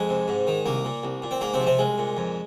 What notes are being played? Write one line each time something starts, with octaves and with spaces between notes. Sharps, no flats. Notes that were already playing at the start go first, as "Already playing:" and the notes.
Already playing: F2 G#3
C3
G#2
D#3
C2 A#3
A#2
C2
A#2
C4
G#2 A#3
C3 C4
F3
C3 C4
C2 G#3
A#2
F2